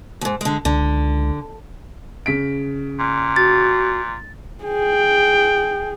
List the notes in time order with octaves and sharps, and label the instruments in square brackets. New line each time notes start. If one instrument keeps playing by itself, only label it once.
[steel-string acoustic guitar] D#2 G#2
D3 G#3
[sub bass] C#2 [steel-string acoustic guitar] D3
[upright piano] C#3 B6 D7
[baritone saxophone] A#2
[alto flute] F#4 [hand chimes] A6
[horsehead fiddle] G#4 [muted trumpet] G5